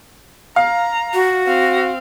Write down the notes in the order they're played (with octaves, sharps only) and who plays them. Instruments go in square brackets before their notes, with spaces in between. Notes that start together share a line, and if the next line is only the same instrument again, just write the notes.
[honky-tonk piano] F5 [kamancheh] A#5
[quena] F#4
[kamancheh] C4 F5